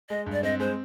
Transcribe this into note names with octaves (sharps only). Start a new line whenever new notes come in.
G#3 D#5
G2
D5
C4 D#5
G#3 C5